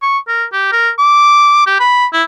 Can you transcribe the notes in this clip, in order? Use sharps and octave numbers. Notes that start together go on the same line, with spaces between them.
C#6
A#4
G4
A#4
D6
G4
B5
E4